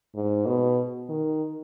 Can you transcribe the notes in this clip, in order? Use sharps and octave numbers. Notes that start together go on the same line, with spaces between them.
G#2
B2
D#3